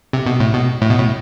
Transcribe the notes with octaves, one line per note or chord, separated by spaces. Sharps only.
C3
B2
A2
B2
A2
B2
A2